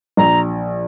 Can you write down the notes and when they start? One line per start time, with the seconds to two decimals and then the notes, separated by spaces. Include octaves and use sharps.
0.17 A#1 A#5